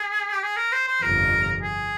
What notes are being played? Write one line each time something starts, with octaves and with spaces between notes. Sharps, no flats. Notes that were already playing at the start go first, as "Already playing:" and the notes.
Already playing: G#4
G4
G#4
A#4
C5
C5
G1 F2 C3 A#4
G#4